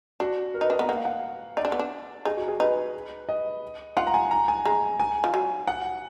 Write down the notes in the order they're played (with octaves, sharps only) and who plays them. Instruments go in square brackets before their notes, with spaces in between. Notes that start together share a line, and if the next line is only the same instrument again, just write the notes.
[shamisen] D4 [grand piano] F#4
[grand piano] A#4
[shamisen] D#4 [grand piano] B4
[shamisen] D4 [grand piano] D#5
[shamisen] B3 [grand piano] A#5
[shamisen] A#3 [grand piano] F#5
[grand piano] F5
F#5
[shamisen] D#4 [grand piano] D5
[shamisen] D4
B3
D4
[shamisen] D#4 [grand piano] G#4
[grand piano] F#4
G#4
[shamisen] D#4 [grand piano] B4
[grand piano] D#5
[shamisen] F4 [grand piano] F#5
[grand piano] A#5
G#5
A#5
G#5
[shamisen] G#3 [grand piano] A#5
[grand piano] G#5
[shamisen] F3
F#3
[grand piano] F#5